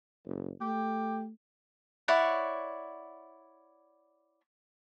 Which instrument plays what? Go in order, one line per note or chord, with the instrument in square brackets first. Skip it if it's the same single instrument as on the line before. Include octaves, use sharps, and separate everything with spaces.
[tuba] F#1
[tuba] A3 [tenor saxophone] G4
[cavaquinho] E4 C#5 D5 F#5